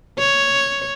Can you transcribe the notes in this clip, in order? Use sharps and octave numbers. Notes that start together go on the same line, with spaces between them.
C#5